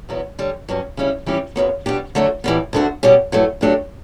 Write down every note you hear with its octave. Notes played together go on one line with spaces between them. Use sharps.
E2 B2 F#3 B3 E4
D3 G3 C#4
G2 F#3 C#4
C#3 G3 C#4 E4
E3 G3 C#4 E4 G4
F#2 C#3 F#3 B3
B2 G3 D4 G4
D3 F#3 A3 D4 F#4
A2 E3 G3 B3
D2 D3 A3 D4 F#4
B2 G3 C#4 G4
G2 F#3 A3 E4
G2 F#3 A3 D4 G4